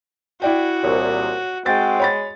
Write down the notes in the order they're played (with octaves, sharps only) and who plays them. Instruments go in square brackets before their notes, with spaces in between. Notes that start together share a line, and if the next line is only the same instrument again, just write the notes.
[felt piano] E4 D5 G5 [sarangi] F#4
[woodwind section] C2 A#2 [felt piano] C#5
[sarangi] G#3 [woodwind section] C4 F#4 G5 [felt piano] A6
[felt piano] C#5 B5 A6